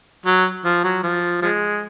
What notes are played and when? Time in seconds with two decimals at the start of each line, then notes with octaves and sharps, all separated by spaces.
0.26 F#3
0.64 F3
0.84 F#3
1.03 F3
1.42 F3 G#3